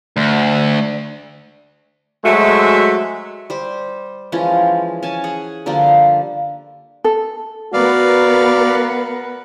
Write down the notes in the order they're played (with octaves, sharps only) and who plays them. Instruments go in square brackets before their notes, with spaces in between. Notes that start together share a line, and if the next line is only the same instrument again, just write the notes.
[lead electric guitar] D2
[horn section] F#3 G#3 A3 F#4 C5 E5
[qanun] G3 C5
E3 F3 G#3 C#4
C#4 G#5 A5
G#4 F#5
D3 F3 G3 A#3
[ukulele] A4
[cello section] B3 A#4 [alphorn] F#4 [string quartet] B4 F#5 [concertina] D5 F5